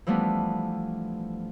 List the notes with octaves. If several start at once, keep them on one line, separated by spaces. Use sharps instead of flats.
E3 F3 G3 A3 B3 D4